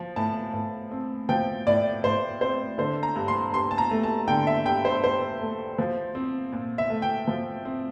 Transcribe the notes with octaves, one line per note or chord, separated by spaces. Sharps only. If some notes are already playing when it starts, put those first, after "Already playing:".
Already playing: F3
A2 A5
A2
C4
F3 G5
A2 D5
A2 C5
C4 C5
D3 C5
A#5
G2
C6
G2 C6
A5
A#5
A3
A5
D3 G5
E5
G2 G5
C5
G2 C5
A3
F3
C4
A#2
E5
A3
G5
F3
C4